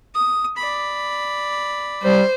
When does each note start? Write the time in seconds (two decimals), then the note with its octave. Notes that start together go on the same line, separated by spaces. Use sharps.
0.14 D#6
0.57 D5 B5
2.03 G3 C5